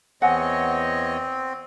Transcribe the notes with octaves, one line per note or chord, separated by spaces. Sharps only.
E2 C4 C#5 D#5 F#5 G#5